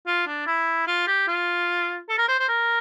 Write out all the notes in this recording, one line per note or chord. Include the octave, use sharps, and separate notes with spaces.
F4
D4
E4
F4
G4
F4
A4
A#4
C5
C5
A#4